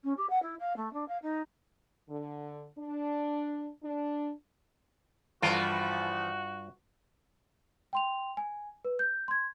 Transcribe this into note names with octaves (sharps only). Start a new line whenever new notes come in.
C#4
G4
F#5
E4
F5
A3
D4
F5
D#4
D3
D4
D4
G2 E3 F3 A3 F4 F#4 G5
G5 C6 F7
G#5
B4
G6
C6 G#6